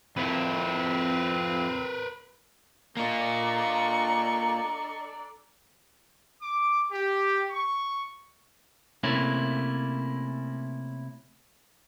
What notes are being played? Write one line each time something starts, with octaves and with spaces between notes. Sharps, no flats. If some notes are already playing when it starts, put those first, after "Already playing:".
F2 C4 E4 A#4 B4
A#3 D4 F4 A4 D5 D#5 A#5 C#6
D6
G4
C#6
C3 A3 A#3 C#4 E4